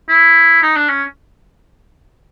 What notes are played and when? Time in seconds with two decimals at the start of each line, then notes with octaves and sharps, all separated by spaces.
0.09 E4
0.62 D#4
0.76 D4
0.89 C#4